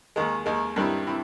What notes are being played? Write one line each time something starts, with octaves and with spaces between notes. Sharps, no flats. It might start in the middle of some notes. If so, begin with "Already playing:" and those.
D#2 D#3 G#3
D#2 D#3 G#3
G2 D#3 G3 C4 E4
C4 E4